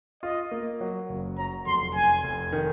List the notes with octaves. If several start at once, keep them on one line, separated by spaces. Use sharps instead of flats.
F4 D#5
A#3
F#3
F#1
F#3 A#5
F1 C6
F1 G#5
F1
D#3